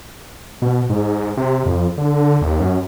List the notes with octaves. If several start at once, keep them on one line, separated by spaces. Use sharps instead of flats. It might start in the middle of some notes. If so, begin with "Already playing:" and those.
B2
G#2
C3
F2
D3
D#2
F#2